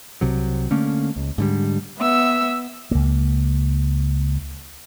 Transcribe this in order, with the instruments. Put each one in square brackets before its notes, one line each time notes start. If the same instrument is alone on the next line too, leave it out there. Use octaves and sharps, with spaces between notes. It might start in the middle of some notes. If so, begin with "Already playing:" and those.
[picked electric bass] C2 C3 F#3
D3 A3 A#3 C#4
C#2
G#2 D3 G3
[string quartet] B3 E5 E6
[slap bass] C#2 A#3